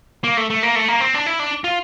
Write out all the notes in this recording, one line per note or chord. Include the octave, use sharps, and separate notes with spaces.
A#3
A3
A3
A#3
A3
A#3
C4
D4
E4
D4
F4